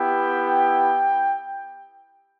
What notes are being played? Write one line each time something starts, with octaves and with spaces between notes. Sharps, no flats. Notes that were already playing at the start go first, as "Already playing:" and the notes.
Already playing: B3 E4 G4 G5